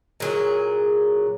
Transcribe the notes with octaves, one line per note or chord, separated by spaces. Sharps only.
A#2 F#3 G#4